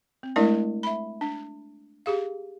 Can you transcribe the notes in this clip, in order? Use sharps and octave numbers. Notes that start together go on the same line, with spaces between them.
C4
G#3 A3 D4 E4 A#4 D5
E5 B5
D4
G4 G#4 F5